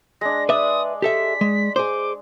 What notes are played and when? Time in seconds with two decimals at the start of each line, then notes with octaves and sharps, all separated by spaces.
0.21 G#3 D4 A#6
0.49 B4 D5 E5 D#6
1.02 G4 A4 E5 B6
1.41 G#3
1.76 G#4 C5 D6